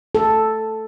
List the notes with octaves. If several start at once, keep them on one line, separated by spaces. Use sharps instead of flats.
A4